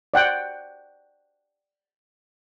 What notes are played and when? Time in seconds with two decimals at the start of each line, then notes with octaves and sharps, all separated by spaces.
0.14 D5 F#5 G5